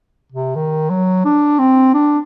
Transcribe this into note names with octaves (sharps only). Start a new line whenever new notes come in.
C3
D#3
F#3
D4
C4
D4